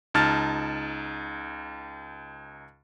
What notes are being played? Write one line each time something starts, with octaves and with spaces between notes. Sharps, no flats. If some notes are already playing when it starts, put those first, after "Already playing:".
C#2 D#4 A5 F6 A6